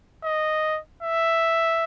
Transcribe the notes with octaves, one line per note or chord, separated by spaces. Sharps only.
D#5
E5